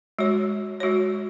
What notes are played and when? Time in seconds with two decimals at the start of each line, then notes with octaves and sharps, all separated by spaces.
0.19 G#3 F#4 C#5
0.80 G#3 F#4 C#5